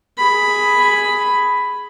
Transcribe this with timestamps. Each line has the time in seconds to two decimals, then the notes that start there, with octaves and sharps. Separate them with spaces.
0.18 G#4 B5